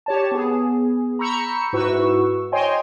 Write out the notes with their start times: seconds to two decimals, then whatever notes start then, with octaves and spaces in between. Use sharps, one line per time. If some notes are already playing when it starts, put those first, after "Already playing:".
0.06 G4 C#5 A5
0.31 B3 G#4
1.19 A#5 B5 C#6 E6 G6 C#7
1.73 G#2 E4 F#4 B4 C#6 E6
2.52 C5 C#5 D#5 G5 G#5 C6